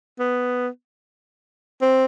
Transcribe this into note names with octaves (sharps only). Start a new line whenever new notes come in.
B3
C4